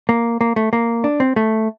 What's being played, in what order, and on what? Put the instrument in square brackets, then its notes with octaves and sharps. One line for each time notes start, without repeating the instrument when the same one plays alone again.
[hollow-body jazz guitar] A#3
A#3
A3
A#3
D4
C4
A3